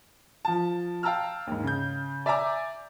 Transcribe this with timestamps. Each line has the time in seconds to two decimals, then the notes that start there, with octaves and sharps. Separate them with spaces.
0.45 F3 A5
1.03 F5 G5 A5 A#5 E6 F6
1.47 D#2 G#2
1.64 C#3 G6
2.26 D5 E5 G#5 A#5 D6